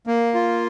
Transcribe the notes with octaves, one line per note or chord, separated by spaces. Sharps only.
A#3
F4